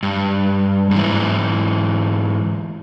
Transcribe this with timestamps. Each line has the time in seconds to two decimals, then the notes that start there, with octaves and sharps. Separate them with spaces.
0.03 G2
0.91 G#2 E3